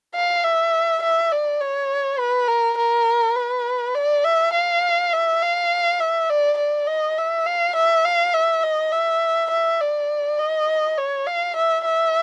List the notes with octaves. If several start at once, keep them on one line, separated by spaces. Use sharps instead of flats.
F5
E5
E5
D5
C#5
B4
A#4
A#4
B4
D5
E5
F5
E5
F5
E5
D5
D5
D#5
E5
F5
E5
F5
E5
D#5
E5
E5
D5
D#5
C#5
F5
E5
E5